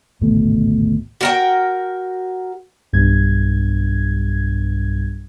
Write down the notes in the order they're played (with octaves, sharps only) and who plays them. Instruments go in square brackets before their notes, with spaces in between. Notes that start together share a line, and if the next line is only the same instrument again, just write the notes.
[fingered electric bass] D1 G#1 B2 A3
[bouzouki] F#4 A#4 G5
[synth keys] B1 G2 G#6